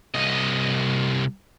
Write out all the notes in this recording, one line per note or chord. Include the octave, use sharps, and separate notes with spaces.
C2 D#5